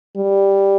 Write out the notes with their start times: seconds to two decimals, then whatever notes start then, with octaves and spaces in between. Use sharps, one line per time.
0.17 G3